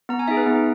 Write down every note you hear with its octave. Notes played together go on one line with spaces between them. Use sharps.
B3 A#5
G#5
D#4 G#4 E5
B4
B3